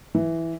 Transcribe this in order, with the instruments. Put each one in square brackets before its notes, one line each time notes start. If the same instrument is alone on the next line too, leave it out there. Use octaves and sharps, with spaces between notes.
[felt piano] E3